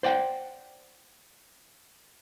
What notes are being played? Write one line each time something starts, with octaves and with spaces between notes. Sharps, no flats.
C5 D5 F#5 G5